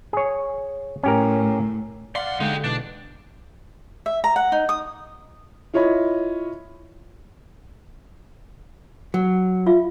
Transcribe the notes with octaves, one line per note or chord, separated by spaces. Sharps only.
G#4 C#5
A2 C#4 G4 A#4
B1 D5 F5 F#5 C6
D3 G#3 D#4 G4
B2 E3 D4
E5
A#5
F#5
D#4
D#6
E4 F4 C#5 D#5 B5
F#3
F4 E5 F5